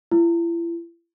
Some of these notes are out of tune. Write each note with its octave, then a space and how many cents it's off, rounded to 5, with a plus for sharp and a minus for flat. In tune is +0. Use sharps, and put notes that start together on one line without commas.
E4 +40